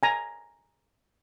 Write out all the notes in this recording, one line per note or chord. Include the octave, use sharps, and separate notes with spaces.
G#5 A#5